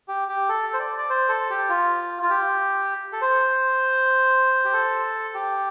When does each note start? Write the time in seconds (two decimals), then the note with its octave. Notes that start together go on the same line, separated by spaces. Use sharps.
0.08 G4
0.28 G4
0.49 A4
0.73 C5
0.79 D5
0.98 D5
1.10 C5
1.29 A4
1.50 G4
1.69 F4
2.22 F4
2.30 G4
3.13 A4
3.22 C5
4.65 G4
4.73 A4
5.34 G4